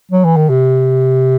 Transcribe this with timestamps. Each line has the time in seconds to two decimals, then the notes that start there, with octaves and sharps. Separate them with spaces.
0.12 F#3
0.25 E3
0.37 D#3
0.50 C3